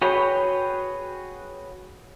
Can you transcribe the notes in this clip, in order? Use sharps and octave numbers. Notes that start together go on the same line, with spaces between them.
F#4 G#4 B4 C#5 G5